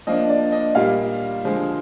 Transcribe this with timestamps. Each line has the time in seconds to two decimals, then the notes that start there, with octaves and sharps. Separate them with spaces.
0.07 F3 A#3 D4 D#5
0.30 D5
0.52 D#5
0.75 A#2 G3 A#3 F5
1.44 D3 F3 G#3